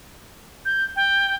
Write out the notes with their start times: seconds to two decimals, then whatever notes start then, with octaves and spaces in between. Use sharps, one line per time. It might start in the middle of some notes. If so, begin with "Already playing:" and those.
0.65 G6
0.96 G5